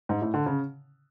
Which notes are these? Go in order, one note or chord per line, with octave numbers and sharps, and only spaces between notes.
G#2
A2
D3
C#3